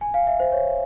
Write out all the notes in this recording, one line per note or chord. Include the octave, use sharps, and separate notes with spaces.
G#5
F5
E5
C5
C#5